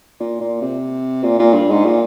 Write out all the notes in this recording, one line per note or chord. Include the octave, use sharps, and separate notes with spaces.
A#2
A#2
C3
A#2
A#2
G2
G#2
A#2